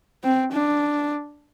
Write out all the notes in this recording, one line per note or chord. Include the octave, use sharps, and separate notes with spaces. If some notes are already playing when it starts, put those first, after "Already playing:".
C4
D4